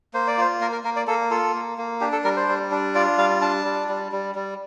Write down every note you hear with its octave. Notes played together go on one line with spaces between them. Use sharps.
A#3 C5
D5
F4 C5
A#3 A#4
A#4
A#3 A#4
D5
A#3 A4
F4 A4
A#3
A#3
D4 G4
A4
G3 A#4
C5
G3
D4
F4 D5
G3 F5
D4 A5
G3
G3
G3
G3